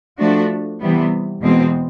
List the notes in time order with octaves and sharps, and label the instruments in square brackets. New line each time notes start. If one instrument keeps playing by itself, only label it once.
[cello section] F3 A3 D4 F#4
C3 E3 G3 B3
E2 B2 G#3 C4